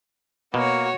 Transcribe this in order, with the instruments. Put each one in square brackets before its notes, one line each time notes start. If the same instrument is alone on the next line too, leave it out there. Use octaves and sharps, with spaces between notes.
[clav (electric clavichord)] B2 [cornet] A#3 [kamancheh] F#4 C#5